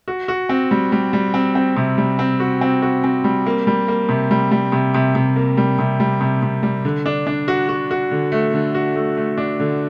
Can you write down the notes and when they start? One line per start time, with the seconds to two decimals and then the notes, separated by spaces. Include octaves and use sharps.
0.08 F#4
0.28 F#4
0.49 C4
0.71 G3
0.92 G3
1.13 G3
1.34 C4
1.55 C4
1.76 C3
1.98 G3
2.19 C4
2.40 F#4
2.61 C4
2.82 F#4
3.04 C4
3.24 G3
3.46 A#3
3.67 G3
3.88 A#3
4.09 C3
4.31 G3
4.51 G3
4.72 C3
4.94 C3
5.15 C3
5.36 A#3
5.57 G3
5.79 C3
6.00 G3
6.21 C3
6.42 C3
6.63 G3
6.85 D3
7.06 D4
7.27 D4
7.48 F#4
7.69 F#4
7.91 F#4
8.11 D3
8.32 A3
8.54 D3
8.75 F#4
8.96 A3
9.17 A3
9.38 D4
9.60 D3